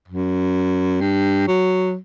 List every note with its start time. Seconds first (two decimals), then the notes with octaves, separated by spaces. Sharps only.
0.08 F#2
1.01 G2
1.48 F#3